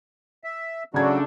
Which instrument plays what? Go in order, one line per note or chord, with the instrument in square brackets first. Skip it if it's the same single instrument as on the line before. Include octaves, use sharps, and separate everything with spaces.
[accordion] E5
[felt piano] C#3 G#6 [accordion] F#3 F#4 [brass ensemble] A3 D4